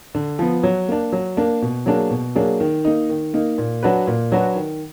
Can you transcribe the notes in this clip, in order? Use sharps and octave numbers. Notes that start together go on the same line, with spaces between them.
D3
F3 B3
F#3
A#3 D4
F#3
A#3 D4
B2
F#3 A#3 D4 G#4
B2
F#3 A#3 D4 G#4
D#3
A#3 D#4
D#3
A#3 D#4
A#2
F#3 D4 F#4 B4
A#2
F#3 D4 F#4 B4
D#3